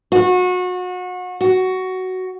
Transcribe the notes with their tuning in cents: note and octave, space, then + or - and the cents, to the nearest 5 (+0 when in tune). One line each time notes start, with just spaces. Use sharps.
F#4 -30
F#4 +10